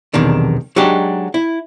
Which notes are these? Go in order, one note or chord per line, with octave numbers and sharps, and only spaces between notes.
B1 E2 C3 D#3 D4
F#3 G#3 D4 D#4 F#4 G4
E4